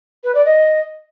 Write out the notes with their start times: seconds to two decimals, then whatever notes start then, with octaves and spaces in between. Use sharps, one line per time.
0.24 B4
0.35 D5
0.45 D#5